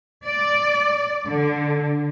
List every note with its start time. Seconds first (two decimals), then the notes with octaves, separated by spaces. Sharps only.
0.25 D5
1.28 D3